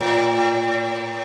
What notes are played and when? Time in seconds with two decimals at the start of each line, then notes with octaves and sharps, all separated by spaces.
0.01 A2